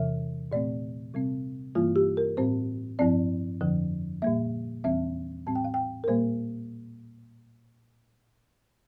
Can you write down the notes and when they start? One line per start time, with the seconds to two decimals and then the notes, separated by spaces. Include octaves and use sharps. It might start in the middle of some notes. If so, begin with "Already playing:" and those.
Already playing: E2 C3 E3 E5
0.52 A#2 A3 C4 D5
1.14 C3 G3 C4
1.75 G2 E3 G3 A#3 F4
1.96 G4
2.17 A#4
2.37 A2 G3 C4 C5
2.99 G2 F3 C4 D5
3.61 F2 D3 F3
4.22 A#2 G3 A#3 E5
4.84 E2 E3 G3 C4 E5
5.46 A2 G3 C4 A5
5.55 G5
5.65 F5
5.74 G5
6.04 A#4
6.08 A#2 G3 A#3 C5